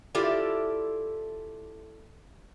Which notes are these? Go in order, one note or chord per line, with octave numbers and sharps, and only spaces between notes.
E4 F4 G4 A4 D5